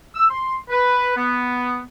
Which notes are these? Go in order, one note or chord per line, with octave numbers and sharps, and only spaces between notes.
E6
C6
B4
B3